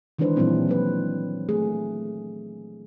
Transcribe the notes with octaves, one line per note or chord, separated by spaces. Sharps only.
D#3 E3 G#3 D4 B4 C5
A#2 E3 F#3 G3 C4 E4
E3 F#3 B4
A3 G#4